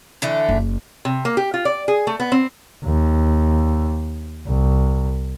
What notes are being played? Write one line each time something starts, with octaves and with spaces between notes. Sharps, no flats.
D3 E3 A3
F#1
C3
A#3
G4
F4
D5
G#4
A3
B3
C4
D#2
C2